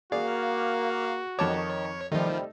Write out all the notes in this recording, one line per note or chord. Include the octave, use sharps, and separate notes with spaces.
A#3 F#4 G#4 D5 F5
F2 D#3 C#5 A5 D6
C3 D#3 F3 G3 A3 D#4